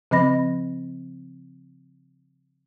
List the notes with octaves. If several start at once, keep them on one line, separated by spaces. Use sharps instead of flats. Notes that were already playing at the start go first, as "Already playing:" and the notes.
C#3 F3 C4 D#5 B5 A#6